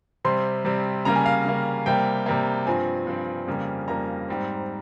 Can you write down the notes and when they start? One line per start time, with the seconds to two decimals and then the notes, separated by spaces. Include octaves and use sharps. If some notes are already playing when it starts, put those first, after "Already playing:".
0.24 C3 G3 C4 C6
0.65 C3 G3 C4
1.05 C#3 G3 A#3 A#5
1.16 G#5
1.26 F5
1.45 C#3 G3 A#3
1.86 C3 G3 A#3 G5
2.26 C3 G3 A#3
2.67 G2 F3 C4 G#5
3.07 G2 F3 C4
3.47 F2 C#3 G3 A#3
3.88 F2 C#3 G3 A#3 A#5
4.28 G#2 G3 C4